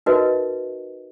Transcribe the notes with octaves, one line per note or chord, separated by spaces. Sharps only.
D#4 F#4 A#4 B4 D#5 E5